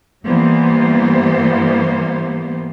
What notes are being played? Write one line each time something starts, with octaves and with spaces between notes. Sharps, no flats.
G2 E3 G3 A#3 B3 C5